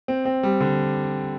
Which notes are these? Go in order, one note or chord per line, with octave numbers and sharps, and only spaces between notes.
C4
C4
G3
D3